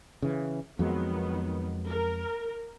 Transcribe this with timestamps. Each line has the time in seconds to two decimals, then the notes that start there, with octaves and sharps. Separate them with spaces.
0.22 C#3 E3
0.79 F2 D#3 F#3 G#3 B3
1.88 A#4